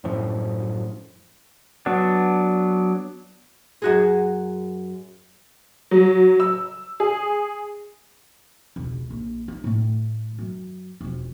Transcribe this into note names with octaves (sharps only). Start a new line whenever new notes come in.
F#2 A2 F3
F#3 B3 D4
F#2 F#4 G#4
F#3
E6
G#4
E1 C#2
A#1
D#4
A2 A3
F#2
E1 F2